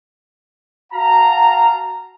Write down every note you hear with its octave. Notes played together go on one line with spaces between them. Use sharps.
F#4 F5 A5 A#5